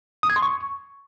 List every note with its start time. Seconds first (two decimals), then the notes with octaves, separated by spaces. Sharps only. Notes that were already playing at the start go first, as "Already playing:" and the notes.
0.23 D#6
0.30 G#6
0.36 C6
0.42 C#6